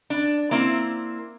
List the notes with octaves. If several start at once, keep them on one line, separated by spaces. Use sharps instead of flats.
D4
A#3 C4 E4